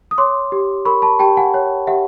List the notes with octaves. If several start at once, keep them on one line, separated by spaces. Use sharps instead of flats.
D#6
C#5 C6 D6
G4
A#4 B5 C#6
A5 B5
G4 G5 A5
F#5 G#5
C#5
G4 E5 F#5